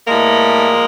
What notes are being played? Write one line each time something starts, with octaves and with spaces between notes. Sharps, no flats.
A2 E3 G3 G#3 A#3
F3